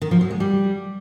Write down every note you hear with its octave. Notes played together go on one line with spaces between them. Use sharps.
D#3
F3
F#3
G#3
G3